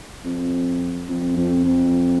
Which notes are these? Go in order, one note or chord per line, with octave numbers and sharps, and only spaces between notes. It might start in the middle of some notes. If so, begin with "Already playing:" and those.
F2
F2
F2
F2